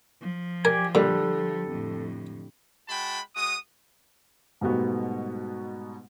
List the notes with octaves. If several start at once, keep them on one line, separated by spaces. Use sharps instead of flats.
F3
G4 A#4 D5 G#5
A#2 D3 G3 A4
F2 A2
G#3 F#4 G5 A5 B5
G#3 F#4 D#6
G#2 B2 G3 A3 B3 F#4